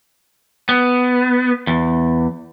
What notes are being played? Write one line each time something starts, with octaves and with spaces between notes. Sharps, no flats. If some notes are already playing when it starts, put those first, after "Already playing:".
B3
E2